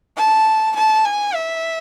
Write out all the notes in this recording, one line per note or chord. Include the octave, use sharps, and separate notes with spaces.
A5
A5
G#5
E5